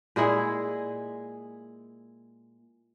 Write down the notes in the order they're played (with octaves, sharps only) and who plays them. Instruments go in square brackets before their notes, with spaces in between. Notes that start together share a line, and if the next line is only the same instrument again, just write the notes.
[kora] A#2 G#3 E4 G#4